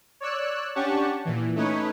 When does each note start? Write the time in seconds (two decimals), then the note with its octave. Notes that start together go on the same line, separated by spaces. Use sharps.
0.21 C#5 D5 E6 F#6
0.75 C#4 D4 G4 F#5 A5 C#6
1.25 A#2 E3
1.56 A3 C#4 D#4 B4 C#5